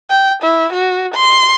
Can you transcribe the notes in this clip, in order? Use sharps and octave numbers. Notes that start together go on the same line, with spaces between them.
G5
E4
F#4
C6